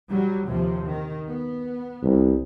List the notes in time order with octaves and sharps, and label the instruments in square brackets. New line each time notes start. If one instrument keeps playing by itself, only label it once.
[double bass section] F#3 G3
D#2 C3 F3
D#3
B3
[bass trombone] C2